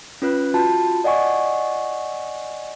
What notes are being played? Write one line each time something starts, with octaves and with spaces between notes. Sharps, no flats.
C#4 F4 B4 F#6
F4 F#4 A5
D5 D#5 F#5 G#5 C#6